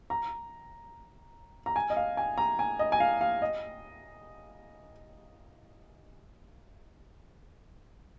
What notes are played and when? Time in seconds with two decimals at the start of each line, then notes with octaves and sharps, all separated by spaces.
0.10 A#5
1.66 A#5
1.76 G#5
1.90 D#5
1.97 F5
2.17 G#5
2.38 A#5
2.59 G#5
2.79 D#5
2.92 G#5
3.00 F5
3.21 F5
3.42 D#5